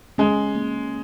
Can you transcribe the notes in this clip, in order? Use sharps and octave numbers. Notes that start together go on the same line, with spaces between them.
G#3 C#4
A#3